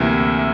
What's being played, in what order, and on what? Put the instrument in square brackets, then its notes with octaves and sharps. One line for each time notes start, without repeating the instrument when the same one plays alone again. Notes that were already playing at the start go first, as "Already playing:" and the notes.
Already playing: [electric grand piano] D2 C3 E3 A#3 E4